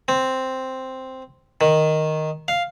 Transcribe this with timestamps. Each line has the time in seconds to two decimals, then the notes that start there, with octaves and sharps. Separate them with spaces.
0.08 C4
1.61 D#3
2.48 F5